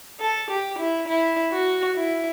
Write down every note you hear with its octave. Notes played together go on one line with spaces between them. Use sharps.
A4
G4
E4
E4
F#4
E4